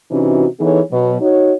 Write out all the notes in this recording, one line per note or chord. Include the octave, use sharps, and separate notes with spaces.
C3 E3 C#4 D#4 F#4
E3 B3 D#4 G#4 A4 C#5
B2 F#3
D#4 F#4 C#5